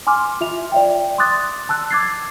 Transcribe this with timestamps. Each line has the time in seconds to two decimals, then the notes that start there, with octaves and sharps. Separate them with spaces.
0.07 G#5 C6 D6 F6
0.41 F4 E5 F7
0.72 D5 E5 G5
1.18 C6 D6 D#6 F#6 A6
1.69 A5 E6 F#6
1.91 D6 G#6 A6 C7